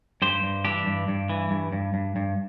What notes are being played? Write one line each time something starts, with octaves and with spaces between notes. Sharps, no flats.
G2 G4 C5
G2
E3 D4 G4
G2
G2
E3
G2
G2
G2
G2